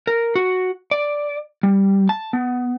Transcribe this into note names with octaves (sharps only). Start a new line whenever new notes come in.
A#4
F#4
D5
G3
A5
B3